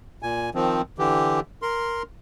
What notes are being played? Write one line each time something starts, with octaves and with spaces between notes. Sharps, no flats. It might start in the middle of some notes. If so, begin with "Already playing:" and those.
A#2 G#5
D#3 F3 C4
D3 E3 G4
A#4 C6